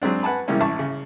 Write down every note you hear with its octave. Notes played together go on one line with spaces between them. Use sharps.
F#3 G#3 C4 D4
B4 F#5 G#5 A5 B5
C3 E3 G3 G#3 A#3 C#4
A1 A5 C#6
C#3